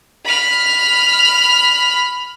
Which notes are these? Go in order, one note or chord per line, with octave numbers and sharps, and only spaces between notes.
B5 F6